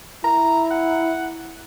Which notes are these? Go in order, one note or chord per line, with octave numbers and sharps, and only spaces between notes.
E4 A#5
F#5